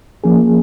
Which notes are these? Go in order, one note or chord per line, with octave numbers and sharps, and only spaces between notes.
F3 A#3 C#4 G#4